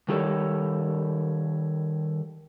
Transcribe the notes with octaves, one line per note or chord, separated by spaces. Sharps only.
D#3 G3 G4 A4 C#5